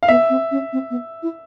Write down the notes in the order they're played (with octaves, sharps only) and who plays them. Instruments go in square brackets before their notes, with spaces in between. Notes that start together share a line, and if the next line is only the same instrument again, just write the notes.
[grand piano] F5
[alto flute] B3 [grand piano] E5
[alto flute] C4
C#4
C4
B3
E4